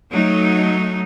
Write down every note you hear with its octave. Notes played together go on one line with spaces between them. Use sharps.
F#3 A3 D#4